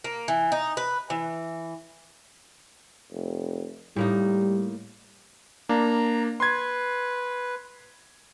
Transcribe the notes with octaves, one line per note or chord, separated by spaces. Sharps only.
A#3
E3
D#4
B4
E3
F1
A2 G3 A#3 D#4
A#3 D4 A#5
B4 C6 G#6